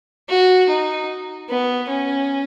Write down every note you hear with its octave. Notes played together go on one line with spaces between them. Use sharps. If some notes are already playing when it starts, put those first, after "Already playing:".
F#4
D#4
B3
C#4